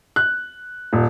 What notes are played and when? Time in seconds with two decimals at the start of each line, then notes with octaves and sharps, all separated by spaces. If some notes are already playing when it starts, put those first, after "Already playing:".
0.16 F#6
0.93 D#1